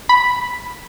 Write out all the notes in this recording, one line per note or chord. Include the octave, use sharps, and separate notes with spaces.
B5